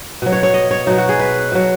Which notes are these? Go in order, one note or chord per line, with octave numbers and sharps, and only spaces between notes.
B2 F#3
C#5
C#5
D#5
C#5
B2 F#3 D#4
F#4
G#4
B4
B2 F#3